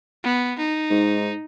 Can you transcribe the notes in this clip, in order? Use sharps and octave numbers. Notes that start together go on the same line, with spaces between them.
B3
D#4
G#2